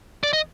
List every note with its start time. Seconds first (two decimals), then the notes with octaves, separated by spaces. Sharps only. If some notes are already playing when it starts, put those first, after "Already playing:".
0.24 D5
0.33 D#5